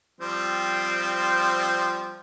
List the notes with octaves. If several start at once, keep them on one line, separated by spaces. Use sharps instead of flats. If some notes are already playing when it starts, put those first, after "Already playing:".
F3 G3 C4